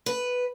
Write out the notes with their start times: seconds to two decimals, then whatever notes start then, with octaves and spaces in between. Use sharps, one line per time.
0.06 B4